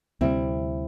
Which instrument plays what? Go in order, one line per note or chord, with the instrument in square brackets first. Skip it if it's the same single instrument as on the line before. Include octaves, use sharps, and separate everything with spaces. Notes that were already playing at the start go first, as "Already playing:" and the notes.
[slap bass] D2 C3 G3 [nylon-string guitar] C4 E4